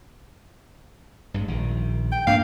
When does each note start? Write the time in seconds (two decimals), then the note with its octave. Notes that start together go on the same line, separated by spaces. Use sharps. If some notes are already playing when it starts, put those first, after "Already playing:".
1.34 G2 F#3 G#3
1.48 A#1 D#3
2.12 G5
2.27 G2 A#3 D4 F5